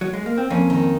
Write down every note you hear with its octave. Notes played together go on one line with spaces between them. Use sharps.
F#3
G#3
A#3
C4
F2 A#3 C#4
D#3